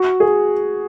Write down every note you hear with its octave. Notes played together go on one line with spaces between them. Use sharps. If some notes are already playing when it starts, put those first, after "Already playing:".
Already playing: F#4
G#4